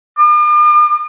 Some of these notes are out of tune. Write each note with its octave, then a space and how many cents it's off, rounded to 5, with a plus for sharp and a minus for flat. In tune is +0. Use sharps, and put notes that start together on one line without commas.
D6 +45